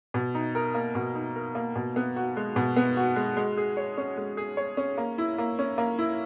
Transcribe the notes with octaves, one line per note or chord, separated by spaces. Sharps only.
B2
D#4
A#4
A#3
B2
D#4
A#4
A#3
B2
B3
F#4
G#3
B2
B3
F#4
G#3
G#3
G#4
C#5
C#4
G#3
G#4
C#5
C#4
A#3
E4
A#3
C#4
A#3
E4